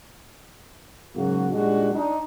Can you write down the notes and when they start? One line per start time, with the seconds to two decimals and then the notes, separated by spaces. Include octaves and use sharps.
1.16 G#2 C#3 F#3 A#3 F#4
1.51 A#2 G3 G#3 D4 D#4 F#4
1.93 D4 D#4